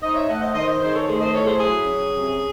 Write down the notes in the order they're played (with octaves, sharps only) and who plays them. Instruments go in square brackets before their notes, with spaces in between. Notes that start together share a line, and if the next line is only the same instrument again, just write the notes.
[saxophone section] D#4 C5 D#5
C#5 E5
A3 D#5 F#5
C5 D#5
D#3 C5 D#5
C5 D#5
D#3 G#4 C5
A4 C#5
A3 G#4 C5
C5 D#5
E4 A4 C#5
G#4 C5
F#3 G#4
C#4
C3